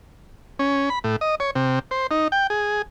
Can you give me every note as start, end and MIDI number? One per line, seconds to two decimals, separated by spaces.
0.59 0.89 61
0.90 0.99 83
1.04 1.16 45
1.21 1.35 75
1.40 1.51 73
1.55 1.79 48
1.91 2.07 72
2.11 2.28 63
2.32 2.47 79
2.50 2.82 68